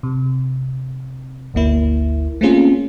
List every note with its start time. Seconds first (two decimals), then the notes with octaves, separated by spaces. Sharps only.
0.03 C3
1.54 G1 D2 A#3 E4
2.41 A3 A#3 C4 C#4 F4 G#4